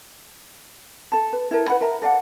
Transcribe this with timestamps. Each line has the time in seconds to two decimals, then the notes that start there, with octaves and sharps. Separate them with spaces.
1.12 A4 A5
1.33 B4
1.51 E4 A4 A#4
1.68 B4 F#5 B5
1.81 A#4 E5 A#5
2.02 A4 D5 F5 F#5